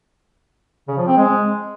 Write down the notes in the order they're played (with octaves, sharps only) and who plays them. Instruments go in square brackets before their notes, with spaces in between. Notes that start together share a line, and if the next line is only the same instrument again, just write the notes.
[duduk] C#3
F3
C4
G#3